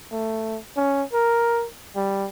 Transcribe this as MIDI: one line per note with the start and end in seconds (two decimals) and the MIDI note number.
0.12 0.59 57
0.77 1.03 61
1.13 1.66 70
1.96 2.28 55